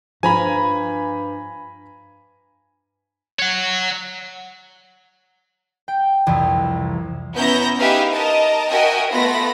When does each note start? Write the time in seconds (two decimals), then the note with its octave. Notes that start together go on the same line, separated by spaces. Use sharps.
0.23 G2 F3 G#5 A#5 B5
3.39 C#5 F#5
5.88 G5
6.26 C2 F2 E3
7.34 B3 C#4 E4 A#5 G6 A#6
7.78 D#4 G4 G#4 B4 E5 F5
8.12 A#4 D#5 A5 A#5
8.70 F#4 A#4 D#5 E5 G5 G#5
9.12 A3 B3 F4 B5 A#6